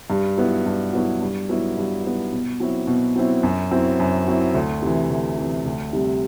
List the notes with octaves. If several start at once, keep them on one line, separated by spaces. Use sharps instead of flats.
G2
F#3 B3 E4
G2
F#3 B3 E4
G2
F#3 B3 E4
G2
F#3 B3 E4
B2
F#3 C4 E4
B2
F#3 C4 E4
F#2
F#3 C4 E4
F#2
F#3 C4 E4
D2
C3 E3
D2
C3 E3
D2
C3 G3